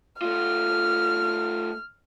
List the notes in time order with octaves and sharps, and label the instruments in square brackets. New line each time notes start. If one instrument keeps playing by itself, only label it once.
[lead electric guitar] A3 F4 [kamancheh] F6